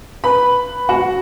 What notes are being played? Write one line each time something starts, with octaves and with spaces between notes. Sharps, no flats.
B4 B5
F#4 F#5